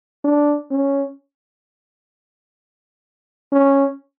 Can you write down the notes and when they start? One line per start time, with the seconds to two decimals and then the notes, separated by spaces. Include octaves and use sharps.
0.24 D4
0.71 C#4
3.52 C#4